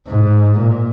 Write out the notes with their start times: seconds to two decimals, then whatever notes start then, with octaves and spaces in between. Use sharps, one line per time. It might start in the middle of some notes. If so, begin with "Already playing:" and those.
0.08 G#2
0.60 A#2